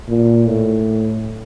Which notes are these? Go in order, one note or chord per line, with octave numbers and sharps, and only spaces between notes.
A#2
A2